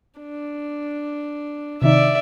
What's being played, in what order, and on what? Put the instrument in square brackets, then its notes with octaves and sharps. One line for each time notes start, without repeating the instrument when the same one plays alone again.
[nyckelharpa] D4
[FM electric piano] C3 D#3 D#4 [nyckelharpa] D5 E5